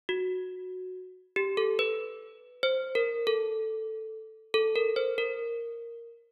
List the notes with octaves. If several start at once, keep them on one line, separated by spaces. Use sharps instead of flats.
F#4
G4
A4
B4
C5
A#4
A4
A4
A#4
C5
A#4